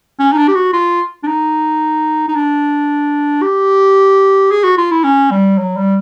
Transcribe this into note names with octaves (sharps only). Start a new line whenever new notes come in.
C#4
D#4
D4
G4
F#4
F4
D4
D#4
D#4
D4
G4
G#4
F#4
F4
E4
C#4
G3
F#3
G3